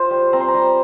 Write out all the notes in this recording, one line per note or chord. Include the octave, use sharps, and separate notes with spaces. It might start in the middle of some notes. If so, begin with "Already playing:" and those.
Already playing: F4 C5
G3
C4 A#5
C6
A#5
G3